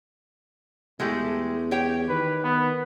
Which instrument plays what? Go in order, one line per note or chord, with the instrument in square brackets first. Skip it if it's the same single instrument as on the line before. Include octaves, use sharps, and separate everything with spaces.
[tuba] E2 [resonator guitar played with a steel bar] G#3 A3 G4
[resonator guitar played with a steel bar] G4 C#5 G5
[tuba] D#3 [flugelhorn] B4
[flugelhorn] B3